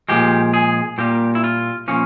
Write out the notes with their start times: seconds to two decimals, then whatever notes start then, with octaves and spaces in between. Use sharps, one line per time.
0.09 A#2 F3 G#3 G4
0.54 G#4
0.98 A#2 G3 A#3 G4
1.35 E4
1.44 F4
1.88 A#2 F3 A#3 C#4